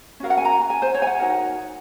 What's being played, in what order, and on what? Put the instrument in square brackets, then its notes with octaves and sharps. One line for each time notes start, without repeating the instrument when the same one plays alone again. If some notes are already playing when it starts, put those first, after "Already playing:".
[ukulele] C#4 F#4 A#4 F5
F#5
G#5
A#5
G#5
C5
C#5
G#5
F#5
D#4 F#4 A#4